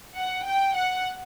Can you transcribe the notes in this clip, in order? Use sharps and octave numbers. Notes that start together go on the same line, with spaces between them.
F#5
G5
F#5